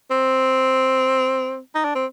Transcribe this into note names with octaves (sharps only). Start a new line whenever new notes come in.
C4
D#4
D4
C4